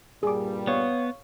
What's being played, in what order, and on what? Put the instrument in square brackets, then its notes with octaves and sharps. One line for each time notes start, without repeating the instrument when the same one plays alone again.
[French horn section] G2 A#2 G3 [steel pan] G#4 D6
[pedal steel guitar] B3 [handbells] C#5 F5 C#6